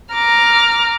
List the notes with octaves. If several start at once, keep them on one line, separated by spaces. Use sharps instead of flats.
A#5 D6 F6